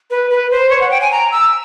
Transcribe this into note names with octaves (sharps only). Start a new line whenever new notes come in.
B4
B4
C5
C#5
F#5
G5
G#5
A#5
E6